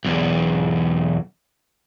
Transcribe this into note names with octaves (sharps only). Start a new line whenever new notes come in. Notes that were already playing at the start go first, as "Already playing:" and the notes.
B1 E2